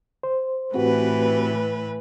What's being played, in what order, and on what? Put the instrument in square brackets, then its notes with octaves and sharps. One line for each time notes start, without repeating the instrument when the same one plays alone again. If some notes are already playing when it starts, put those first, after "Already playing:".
[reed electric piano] C5
[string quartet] A2 E3 B4 [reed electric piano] C4 F#4 G4